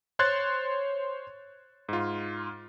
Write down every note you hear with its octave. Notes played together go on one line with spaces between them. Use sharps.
C5 C#5 C6 F#6 G#6 A6
G#2 F4